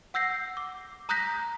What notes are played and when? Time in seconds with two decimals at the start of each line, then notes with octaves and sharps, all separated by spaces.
0.14 F#5 E6 G6 A#6 C7
0.57 D6
1.09 A#5 D#6 F#6 G6 A#6 B6